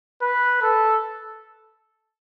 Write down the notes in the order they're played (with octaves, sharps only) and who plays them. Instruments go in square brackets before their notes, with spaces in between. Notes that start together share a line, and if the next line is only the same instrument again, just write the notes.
[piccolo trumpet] B4
A4